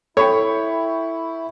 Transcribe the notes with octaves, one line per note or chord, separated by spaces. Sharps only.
E4 A4 C#5 G5 B5 C#6